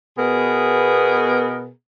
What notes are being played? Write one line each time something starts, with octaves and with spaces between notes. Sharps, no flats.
B2 B3 G#4 A#4